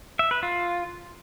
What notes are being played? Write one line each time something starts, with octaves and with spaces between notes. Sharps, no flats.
E5
B4
F4